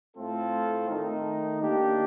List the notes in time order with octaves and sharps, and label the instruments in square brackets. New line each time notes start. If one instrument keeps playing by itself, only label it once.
[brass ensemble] A2 A3 C4 F4 A4
D#3 A3 D#4
D#3 A#3 D4 G4